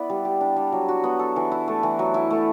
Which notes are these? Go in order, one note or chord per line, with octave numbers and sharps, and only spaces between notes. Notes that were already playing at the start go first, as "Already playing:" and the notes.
Already playing: B3 E4 B4 D5
G3
G4
D4
G3
F#3
F#4
B3
A4
E3
E4
A3
E3
F#3
E4
A3